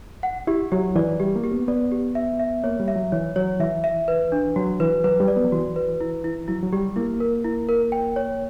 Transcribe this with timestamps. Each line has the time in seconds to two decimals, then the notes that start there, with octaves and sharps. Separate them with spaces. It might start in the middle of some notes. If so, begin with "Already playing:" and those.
0.23 F#5
0.47 E4 G4
0.72 F#3 G4
0.96 E3 D5
1.20 G3 G4
1.36 A#3
1.44 G4
1.52 B3
1.68 B3 D5
1.92 G4
2.15 E5
2.40 E5
2.64 A#3 C#5
2.80 G3
2.88 E5
2.96 F#3
3.12 E3 C#5
3.36 F#3 C#5
3.60 E3 E5
3.84 E5
4.08 B4
4.32 D4
4.56 F#3 F#4
4.80 E3 B4
5.04 F#3 B4
5.20 G3
5.28 D5
5.36 B3
5.44 F#3
5.52 E3 F#4
5.76 B4
6.01 E4
6.24 E4
6.48 F#3 E4
6.63 F#3
6.73 G3 G4
6.96 A#3 E4
7.20 A#4
7.44 E4
7.69 A#4
7.92 G5
8.16 C#5